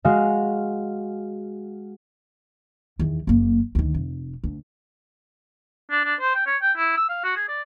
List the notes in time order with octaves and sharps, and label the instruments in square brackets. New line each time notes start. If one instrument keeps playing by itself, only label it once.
[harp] G#3 F#4 F5
[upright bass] E2 D#3
F#1 A#3
D2 D#3
F1
D2
[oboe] D4
D4
C5
G5
C#5
G5
E4
E6
F5
F#4
G#4
D5